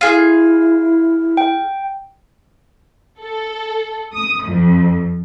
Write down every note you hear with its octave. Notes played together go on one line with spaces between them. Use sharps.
E4 F4 G#4
G5
A4
D#6
F2